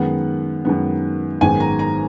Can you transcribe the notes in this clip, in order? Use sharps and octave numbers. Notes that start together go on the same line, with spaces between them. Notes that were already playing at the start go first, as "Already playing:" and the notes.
Already playing: F#2 D#3 G#3 B3 F#5
F#2 D#3 G#3 B3
G#1 F#2 D#3 G#3 B3 G#5
A#5
A#5